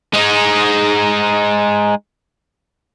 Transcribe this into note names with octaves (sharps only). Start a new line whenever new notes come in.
G#3 D#4